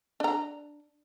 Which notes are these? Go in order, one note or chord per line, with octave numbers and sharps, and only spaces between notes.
D4 A#5